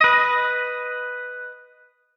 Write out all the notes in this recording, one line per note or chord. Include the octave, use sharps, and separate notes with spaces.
B4 D#5